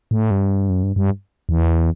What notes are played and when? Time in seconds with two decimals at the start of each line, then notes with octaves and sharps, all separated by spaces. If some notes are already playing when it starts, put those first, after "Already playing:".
0.11 A2
0.31 G2
0.70 F#2
0.83 G2
0.96 G2
1.49 E2